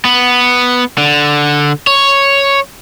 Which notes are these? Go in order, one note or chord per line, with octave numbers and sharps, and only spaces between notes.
B3
D3
C#5